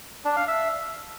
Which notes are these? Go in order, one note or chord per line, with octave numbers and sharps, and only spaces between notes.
D4
F5
E5